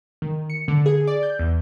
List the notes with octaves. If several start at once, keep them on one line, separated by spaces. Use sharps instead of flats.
D#3
C#7
D3
G#4
D5
G6
E2